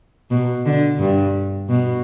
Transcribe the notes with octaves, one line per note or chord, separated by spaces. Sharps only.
B2
D3
G2
B2